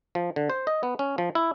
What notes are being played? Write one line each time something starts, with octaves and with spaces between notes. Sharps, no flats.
F3
D3
C5
D#5
B3
C#4
F3
E4